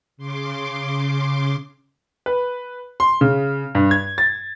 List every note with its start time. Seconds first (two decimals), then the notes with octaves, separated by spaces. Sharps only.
0.17 C#3 C6 D6
2.26 B4
3.00 C6
3.21 C#3
3.75 G2
3.91 G#6
4.18 A6